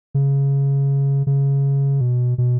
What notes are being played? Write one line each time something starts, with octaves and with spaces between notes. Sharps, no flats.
C#3
C#3
B2
B2